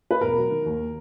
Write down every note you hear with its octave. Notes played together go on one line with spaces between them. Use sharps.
B4
E1 A#4
F#3
D#3
D#2